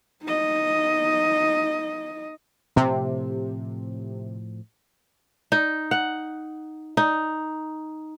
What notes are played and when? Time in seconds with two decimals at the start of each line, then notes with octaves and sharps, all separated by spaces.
0.23 D#4 D#5
2.76 A2 C3 F3 C4
5.52 D#4
5.91 F#5
6.97 D#4